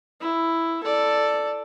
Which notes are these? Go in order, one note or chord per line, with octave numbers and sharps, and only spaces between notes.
E4
A4 D5